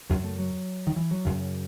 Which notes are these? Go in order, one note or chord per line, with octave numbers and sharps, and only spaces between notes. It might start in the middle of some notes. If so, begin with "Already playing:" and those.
F#2 C#3 F#3
A3
F#3
D#3
E3
F#3
F#2 C#3